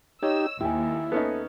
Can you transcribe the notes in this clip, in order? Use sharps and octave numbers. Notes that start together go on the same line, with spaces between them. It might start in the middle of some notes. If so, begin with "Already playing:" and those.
D#4 G4 C#5 D#5 E6
D#2 E4 G4 G#5
B3 C#4 D#4 A4 E5